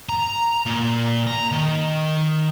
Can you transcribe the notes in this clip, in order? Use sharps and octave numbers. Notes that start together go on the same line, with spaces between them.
A#5
A#2
A#5
D#3